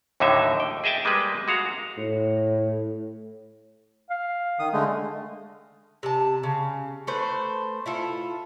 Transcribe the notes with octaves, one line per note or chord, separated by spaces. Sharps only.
D#2 A2 D3 F#3 D#4 E5
G5
G#4 D#5 E5 G5 A5
G3 G#3 A#3 B4
G#3 F#4 F5 A#5
A2
F5
D#3 D#6
D3 G#3 A3
C3 A5
C#3
A3 B4 C5
E4 F4 A4